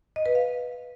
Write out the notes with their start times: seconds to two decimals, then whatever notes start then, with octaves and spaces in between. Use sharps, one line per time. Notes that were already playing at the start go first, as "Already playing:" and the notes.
0.16 D#5
0.26 B4
0.35 F5